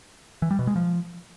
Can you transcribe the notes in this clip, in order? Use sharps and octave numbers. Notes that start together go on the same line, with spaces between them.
E3
G3
B2
G#3
F3